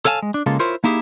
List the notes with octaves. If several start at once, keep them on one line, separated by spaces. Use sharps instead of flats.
A4 C#5 F5 G#5 A5
G#3
D4
C#3 G#3 A#3 F4 A4
E4 F4 A#4 C5 C#5
A#3 D#4 E4 G4 G#4